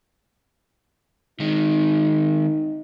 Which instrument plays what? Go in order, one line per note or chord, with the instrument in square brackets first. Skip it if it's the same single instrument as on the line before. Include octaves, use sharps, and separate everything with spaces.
[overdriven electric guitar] D#3 G#3 [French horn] D#4